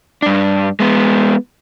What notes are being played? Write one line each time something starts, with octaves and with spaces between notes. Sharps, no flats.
G2 D4
G#3 B3